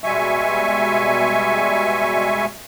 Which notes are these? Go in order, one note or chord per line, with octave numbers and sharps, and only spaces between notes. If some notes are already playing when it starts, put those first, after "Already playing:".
B2 G3 G#3 E5 G#5 C#6